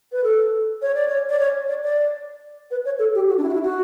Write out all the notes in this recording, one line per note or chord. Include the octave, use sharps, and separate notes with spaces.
B4
A4
C#5
D5
C#5
D5
C#5
D5
D5
B4
C#5
A4
G4
F#4
D4
E4
F#4
E4
F#4